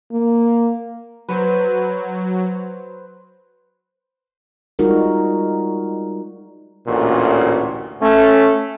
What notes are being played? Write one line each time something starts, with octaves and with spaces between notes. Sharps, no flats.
A#3
F#3 B4 C5
G3 G#3 D#4 F4 F#4 A#4
A1 D2 A#2 F#4
A3 C#4